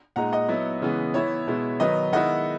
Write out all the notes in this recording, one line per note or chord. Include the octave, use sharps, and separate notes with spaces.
A#2 G#3 D#4 F#5 A#5
D#5 F#5
F#3 B3 E4
C#3 E3 G#3 B3
E3 B3 E4 C#5 E5
B2 G#3 B3 E4
D#3 F#3 B3 D#4 B4 D#5
D#3 G#3 B3 E4 D#5 F#5